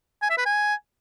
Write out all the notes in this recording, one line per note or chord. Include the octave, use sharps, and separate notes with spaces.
G#5
E5
B4
G#5